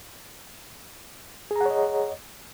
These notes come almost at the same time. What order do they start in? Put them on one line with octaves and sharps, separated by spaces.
G#4 A#5 F#5 C#5 D#5